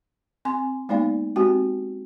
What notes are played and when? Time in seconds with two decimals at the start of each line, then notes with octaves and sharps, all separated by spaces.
0.45 C4 G#5 C6
0.89 G#3 A#3 B3 D#4 D5 F5
1.36 G#3 C4 F#4 G4 G5